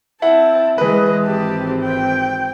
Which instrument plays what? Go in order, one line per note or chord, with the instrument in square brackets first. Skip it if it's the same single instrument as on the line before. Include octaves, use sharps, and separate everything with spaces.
[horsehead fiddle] C4 A5 [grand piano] E4 F#5
[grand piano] E3 B4 [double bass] G#3 [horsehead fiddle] D#5
[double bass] G#1 C4 [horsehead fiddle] G4 A5
[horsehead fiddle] G5